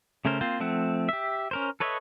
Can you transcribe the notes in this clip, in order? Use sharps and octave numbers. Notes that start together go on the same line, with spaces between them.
C#3 A3 C#4 A#4 C5
A#3 C4 F4 C5
F3 A3 C4 F#5
G4 E5
C#4 A#4 C5
A4 B4 C#5 D#5 E5